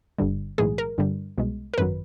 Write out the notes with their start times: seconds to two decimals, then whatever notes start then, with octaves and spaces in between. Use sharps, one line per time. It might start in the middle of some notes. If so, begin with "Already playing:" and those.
0.19 G1 G2 D3 G3
0.58 B1 A2 E3 G#3 G#4
0.78 A#4
0.98 G2 D3 G3
1.38 C2 B2 G#3
1.74 A#4
1.78 G#1 F#2 D#3 F#3 B4